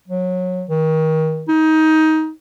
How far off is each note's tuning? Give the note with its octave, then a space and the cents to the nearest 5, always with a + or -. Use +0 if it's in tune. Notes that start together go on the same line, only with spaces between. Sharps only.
F#3 -20
D#3 +30
D#4 +20